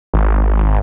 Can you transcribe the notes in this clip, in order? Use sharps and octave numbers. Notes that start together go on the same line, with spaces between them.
G#1